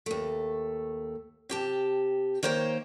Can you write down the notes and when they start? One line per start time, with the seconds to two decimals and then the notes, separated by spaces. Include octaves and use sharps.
0.06 D#2 A3
1.49 C3 G4 A5
2.43 D#3 A#3 C5 C#5 G5